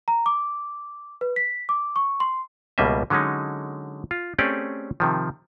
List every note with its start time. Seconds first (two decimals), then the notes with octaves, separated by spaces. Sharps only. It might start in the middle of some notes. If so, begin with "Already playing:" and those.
0.08 A#5
0.26 D6
1.21 B4
1.36 B6
1.69 D6
1.96 C#6
2.20 C6
2.78 C#2 B2 G3 A#3 D#5 E5
3.10 D3 F#3 G#3 C#4 D#4
4.11 F4
4.38 A3 C4 C#4 G4 G#4 D5
5.00 C3 D#3 F3